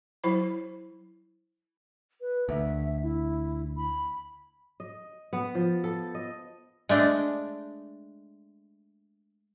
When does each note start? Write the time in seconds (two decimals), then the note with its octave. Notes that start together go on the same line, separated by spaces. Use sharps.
0.24 F#3 E4 C5 B5
2.21 B4
2.49 D2 E5
3.02 E4
3.77 B5
4.80 D#5
5.33 B3
5.55 F3
5.84 A4
6.15 D#5
6.89 G#3 A3 D4